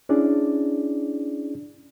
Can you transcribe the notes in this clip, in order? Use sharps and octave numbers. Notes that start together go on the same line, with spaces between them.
C#4 D4 E4 G#4 D5